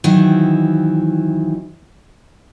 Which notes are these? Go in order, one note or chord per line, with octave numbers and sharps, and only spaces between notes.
D#3 E3 F#3 C4 E4